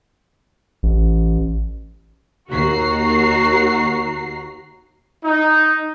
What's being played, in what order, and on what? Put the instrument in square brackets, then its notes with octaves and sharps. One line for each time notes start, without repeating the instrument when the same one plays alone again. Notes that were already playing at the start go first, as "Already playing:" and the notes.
[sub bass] A1
[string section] D#2 F#4 A#5 C7
[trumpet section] D#4